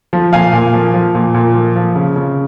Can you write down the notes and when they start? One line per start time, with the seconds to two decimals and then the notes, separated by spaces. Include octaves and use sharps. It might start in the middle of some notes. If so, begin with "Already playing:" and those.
0.13 F3
0.33 A#2 F5 G#5
0.53 A#2
0.74 F3
0.94 F3
1.15 A#2
1.35 A#2
1.55 F3
1.76 F3
1.95 C#3
2.16 C#3